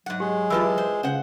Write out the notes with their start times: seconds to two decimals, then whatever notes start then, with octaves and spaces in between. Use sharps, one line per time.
0.06 G#2 F#3 F#5
0.20 G#3 G4
0.50 E3 F4 G4 B4 A5 E6
0.78 C5
1.03 C#3 C#4 C5 F#5